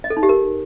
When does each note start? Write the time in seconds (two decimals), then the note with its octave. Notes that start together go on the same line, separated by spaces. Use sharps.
0.04 D#5
0.10 A4
0.17 D#4
0.23 G4
0.29 A#4